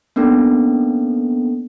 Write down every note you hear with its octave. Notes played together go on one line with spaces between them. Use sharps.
A#3 B3 C#4 D4 A4